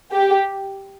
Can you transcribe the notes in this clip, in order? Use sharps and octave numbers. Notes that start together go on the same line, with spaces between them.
G4